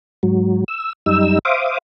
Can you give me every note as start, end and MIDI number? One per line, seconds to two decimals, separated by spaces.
0.23 0.64 44
0.23 0.64 54
0.68 0.93 88
1.06 1.39 42
1.06 1.39 55
1.06 1.39 63
1.06 1.39 88
1.45 1.78 72
1.45 1.78 76
1.45 1.78 77
1.45 1.78 86
1.45 1.78 87